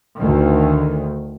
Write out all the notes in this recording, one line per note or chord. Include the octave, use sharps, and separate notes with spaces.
D2 D#3